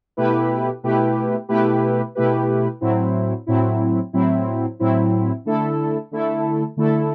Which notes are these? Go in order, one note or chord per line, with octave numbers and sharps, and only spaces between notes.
B2 A3 E4 G4 B4
B2 A3 E4 G4 B4
B2 A3 E4 G4 B4
B2 A3 E4 G4 B4
A2 F#3 C4 E4
A2 F#3 C4 E4
A2 F#3 C4 E4
A2 F#3 C4 E4
D3 A3 E4 A4
D3 A3 E4 A4
D3 A3 E4 A4